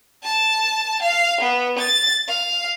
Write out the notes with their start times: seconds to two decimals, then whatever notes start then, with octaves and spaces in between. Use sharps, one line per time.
0.24 A5
1.02 F5
1.41 B3
1.78 A6
2.28 F5